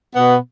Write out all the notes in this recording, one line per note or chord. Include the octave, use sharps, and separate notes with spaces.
B2 B3